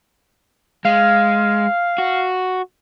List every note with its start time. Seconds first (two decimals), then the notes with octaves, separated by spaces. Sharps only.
0.85 G#3 F5
1.98 F#4